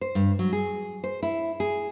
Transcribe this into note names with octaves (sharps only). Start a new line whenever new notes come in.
C5
G2
F#3
G#4
C5
E4
G#4